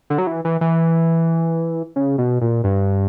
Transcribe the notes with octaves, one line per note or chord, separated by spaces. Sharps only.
D3
F#3
E3
E3
E3
C#3
B2
A#2
G2